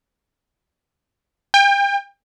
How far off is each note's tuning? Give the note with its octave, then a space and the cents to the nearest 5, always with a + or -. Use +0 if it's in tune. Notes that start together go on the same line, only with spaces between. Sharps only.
G5 +35